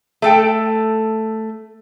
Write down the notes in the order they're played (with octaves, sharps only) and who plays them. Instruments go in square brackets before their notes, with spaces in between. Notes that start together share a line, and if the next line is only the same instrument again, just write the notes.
[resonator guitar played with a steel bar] A3 A4 G5